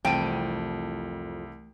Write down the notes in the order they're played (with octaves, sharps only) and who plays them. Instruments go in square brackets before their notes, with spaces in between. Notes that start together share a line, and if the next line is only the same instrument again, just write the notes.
[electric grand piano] C2 A5 D#7 [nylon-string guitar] F2 [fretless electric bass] E3 A3 [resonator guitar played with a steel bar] G5